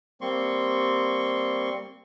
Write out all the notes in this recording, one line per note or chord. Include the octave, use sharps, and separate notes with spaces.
G3 A#3 C4 C6 C#6